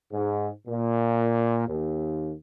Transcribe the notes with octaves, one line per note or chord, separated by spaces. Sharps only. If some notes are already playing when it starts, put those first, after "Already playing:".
G#2
A#2
D#2